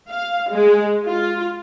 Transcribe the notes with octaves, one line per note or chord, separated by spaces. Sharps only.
F5
G#3
F4